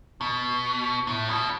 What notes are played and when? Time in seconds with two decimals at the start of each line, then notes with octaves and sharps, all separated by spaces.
0.21 B2
1.07 A2
1.29 B2